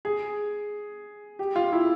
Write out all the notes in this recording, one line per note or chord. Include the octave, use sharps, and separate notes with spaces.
G#4
G4
F4
E4